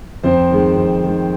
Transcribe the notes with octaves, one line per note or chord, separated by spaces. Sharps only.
F2 C4 C5
D#3 G#3
F2
D#3 G#3